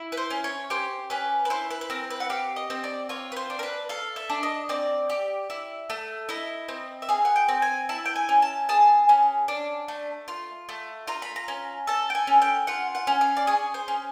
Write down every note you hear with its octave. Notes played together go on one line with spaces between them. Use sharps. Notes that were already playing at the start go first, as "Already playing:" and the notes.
Already playing: E4
B4
C5
C#4
C#5
G4 C5
C#4 B4
B4
E4 C5
B4
B4
C4 A#4
B4
F#5
G4 F5
D#5
C4
D5
F4 C#5
B4
C5
D4
A#4
B4
A4 F5
E5
D4
D#5
C4 D5
G4
E4
A3
E4 D#5
C4
E5
G#4 F5
F#5
G5
C4
G#5
E4 A5
G5
G#5
C#4
A5
G#4 A5
C#4
D4
A3
F4
A3
F4 A#5
B5
A#5
C#4
A4 A5
G5
G#5
C#4
G5
F4 F#5
F#5
C#4
F5
D5
G#4 C#5
C5
C#4